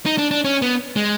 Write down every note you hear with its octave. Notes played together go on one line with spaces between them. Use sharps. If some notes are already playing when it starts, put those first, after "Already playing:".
D#4
D4
D4
C#4
B3
G#3